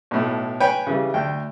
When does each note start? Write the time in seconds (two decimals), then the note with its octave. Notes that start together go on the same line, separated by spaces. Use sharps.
0.11 B1 A2
0.60 B4 C#5 G5 G#5 B5
0.87 C#3 E3 G3
1.14 D2 G5